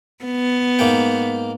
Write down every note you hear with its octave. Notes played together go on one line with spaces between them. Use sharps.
B3
G#2 A#3 G5